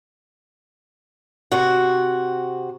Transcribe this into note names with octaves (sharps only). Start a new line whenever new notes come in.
C3 F#4